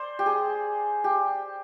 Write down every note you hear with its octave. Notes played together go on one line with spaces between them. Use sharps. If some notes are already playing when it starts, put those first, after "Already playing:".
Already playing: C5 D5
G4
G#4
G4